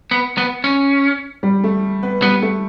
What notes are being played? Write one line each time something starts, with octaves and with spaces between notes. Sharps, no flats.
B3
B3
C#4
G3
A3
B3
G3 B3
A3